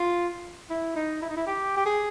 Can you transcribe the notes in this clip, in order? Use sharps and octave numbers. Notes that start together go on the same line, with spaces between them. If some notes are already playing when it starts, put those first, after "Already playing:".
Already playing: F4
E4
D#4
E4
D#4
E4
G4
G4
G#4